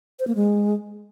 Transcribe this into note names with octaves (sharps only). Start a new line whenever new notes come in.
C5
A#3
G#3